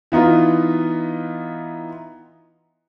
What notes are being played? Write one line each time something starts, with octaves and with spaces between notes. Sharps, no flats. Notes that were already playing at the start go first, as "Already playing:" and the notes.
E3 B3 D#4 F4